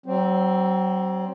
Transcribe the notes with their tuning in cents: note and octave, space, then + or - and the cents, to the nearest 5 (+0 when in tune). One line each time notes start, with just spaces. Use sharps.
F#3 +35 C4 +0